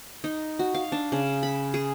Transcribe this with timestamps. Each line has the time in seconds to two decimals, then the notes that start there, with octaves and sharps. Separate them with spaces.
0.24 D#4
0.59 F#4
0.74 F5
0.92 D4
1.12 C#3
1.43 B5
1.74 G#4